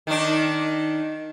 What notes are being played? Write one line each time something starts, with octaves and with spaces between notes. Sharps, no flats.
D#3 D4